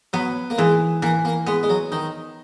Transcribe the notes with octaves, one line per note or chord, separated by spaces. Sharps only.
F#3 B3
A#3
E3 G#3
E3 A#3
A#3
G#3 B3
G#3
F#3
D#3 D#4